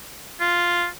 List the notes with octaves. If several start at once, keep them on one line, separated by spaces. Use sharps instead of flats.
F4